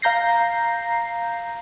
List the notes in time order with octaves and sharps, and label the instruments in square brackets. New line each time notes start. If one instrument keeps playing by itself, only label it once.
[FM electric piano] F5 A#5 G6 A#6 C7